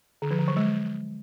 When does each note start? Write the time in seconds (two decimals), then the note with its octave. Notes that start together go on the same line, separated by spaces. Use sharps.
0.22 D3
0.31 F3
0.39 D3
0.48 F#3
0.56 G#3